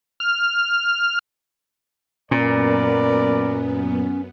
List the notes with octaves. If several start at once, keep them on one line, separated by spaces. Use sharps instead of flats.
F6
F#2 A#2 B3 C#4 A#4 B4 D5